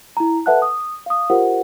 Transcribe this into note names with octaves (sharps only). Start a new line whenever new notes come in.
E4 A#5
A4 B4 E5 F#5 A5 F#6
D#6
F5 D#6
F4 G4 A#4 C5 F#5